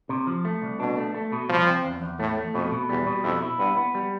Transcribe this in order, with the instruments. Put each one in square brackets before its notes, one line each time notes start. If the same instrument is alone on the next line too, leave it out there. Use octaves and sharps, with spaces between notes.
[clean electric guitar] C3
F3
A3
C2
[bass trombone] B2 [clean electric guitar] D4
[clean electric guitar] A3
A3
B2
[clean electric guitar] C2 [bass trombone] F3
[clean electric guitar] C4
E2
E2
[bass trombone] A2 [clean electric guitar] A3
[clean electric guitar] A3
[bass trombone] F2 [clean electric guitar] B2
[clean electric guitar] B2
[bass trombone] E2 [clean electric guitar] G3
[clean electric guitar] B2
[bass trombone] F2 [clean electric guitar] E4
[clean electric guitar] E4
[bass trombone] G2 [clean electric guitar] B3
[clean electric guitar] B3
G3